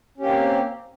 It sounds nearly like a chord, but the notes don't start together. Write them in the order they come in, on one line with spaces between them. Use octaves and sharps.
C#4 G4 A#3 C4